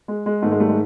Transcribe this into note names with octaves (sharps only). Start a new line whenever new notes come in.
G#3
G#3
G#2 D#3 A3
G#3
G3 A3
G#3